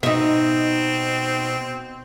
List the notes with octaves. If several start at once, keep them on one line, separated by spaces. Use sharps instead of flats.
B2 C4 D#4 E5